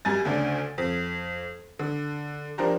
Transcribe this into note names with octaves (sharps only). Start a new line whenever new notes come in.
F#2 G3 G#5 A6
D2 C#3 D4
F2
D3
F3 D4 G4 A#4 C5